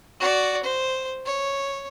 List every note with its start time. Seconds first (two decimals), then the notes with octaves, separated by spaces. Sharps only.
0.20 F#4 D5
0.64 C5
1.25 C#5